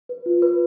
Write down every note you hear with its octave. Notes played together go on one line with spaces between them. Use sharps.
B4
F4
B4